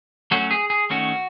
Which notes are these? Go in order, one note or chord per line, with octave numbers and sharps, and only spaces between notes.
F#3 A3 C#4 F#4
G#4
G#4
D#3 A3 C#4 F#4